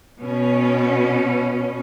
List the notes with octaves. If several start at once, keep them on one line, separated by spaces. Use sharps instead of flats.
B2 C#4